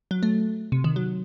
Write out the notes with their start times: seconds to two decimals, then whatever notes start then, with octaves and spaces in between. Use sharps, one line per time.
0.11 F#3
0.23 A3
0.72 C3
0.84 D#3
0.96 F#3